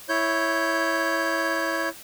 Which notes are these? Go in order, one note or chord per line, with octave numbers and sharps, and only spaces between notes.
E4 C#5 G6